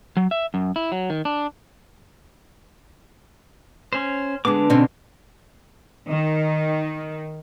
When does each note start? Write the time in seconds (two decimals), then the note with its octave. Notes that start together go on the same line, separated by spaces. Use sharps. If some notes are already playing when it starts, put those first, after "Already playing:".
0.17 F#3
0.31 E5
0.54 F#2
0.76 E4
0.92 F#3
1.10 D#3
1.25 D4
3.93 C#4 C5
4.45 D3 G#3 B3 D4 D6
4.70 B2 C4 C#4
6.09 D#3